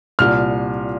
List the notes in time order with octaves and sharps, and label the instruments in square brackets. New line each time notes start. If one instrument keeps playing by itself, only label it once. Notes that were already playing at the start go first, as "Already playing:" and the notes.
[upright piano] C2 A#2 F6